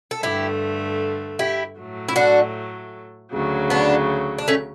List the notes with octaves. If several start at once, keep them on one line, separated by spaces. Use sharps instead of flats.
A4
G2 D3 A3 E4 G4
E4 G4
A2 F#3 A3
E4
D4 F#4
D2 C#3 F#3
B3 D4
D4
A3 C#4